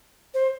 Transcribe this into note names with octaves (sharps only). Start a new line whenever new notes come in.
C5